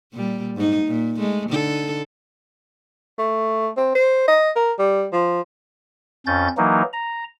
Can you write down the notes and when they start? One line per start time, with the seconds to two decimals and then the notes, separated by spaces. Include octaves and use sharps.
0.13 A#2 G3
0.56 G#2 D#4
0.87 A#2
1.17 G#3 A3
1.50 D3 D#4 A4
3.18 A3
3.77 C4
3.95 C5
4.28 D#5
4.56 A#4
4.79 G3
5.13 F3
6.27 F2 C#4 G6 A6
6.57 E3 F#3 A#3 D#4
6.93 A#5